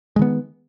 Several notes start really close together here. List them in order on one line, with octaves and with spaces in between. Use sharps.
G#3 D#3 B3